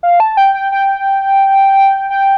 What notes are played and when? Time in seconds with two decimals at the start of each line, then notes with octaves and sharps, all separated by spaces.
0.03 F5
0.20 A5
0.37 G5
0.54 G5
0.72 G5
2.10 G5